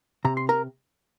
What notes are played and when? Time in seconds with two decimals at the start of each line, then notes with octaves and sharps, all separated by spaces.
0.25 C3 A#5
0.37 C6
0.49 A#4 A#5